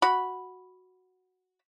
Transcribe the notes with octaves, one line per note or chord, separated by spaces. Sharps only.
F#4 B5